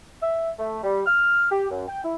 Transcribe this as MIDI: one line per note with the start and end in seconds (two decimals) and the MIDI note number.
0.21 0.49 76
0.59 0.79 57
0.83 1.02 55
1.06 1.46 89
1.51 1.69 67
1.70 1.86 42
1.87 2.03 79
2.04 2.15 64